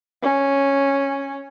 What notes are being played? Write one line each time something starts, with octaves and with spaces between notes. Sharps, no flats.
C#4